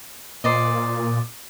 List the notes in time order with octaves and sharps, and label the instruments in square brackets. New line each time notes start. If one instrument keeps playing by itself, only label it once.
[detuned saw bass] A#2 [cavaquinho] C5 D5 D#5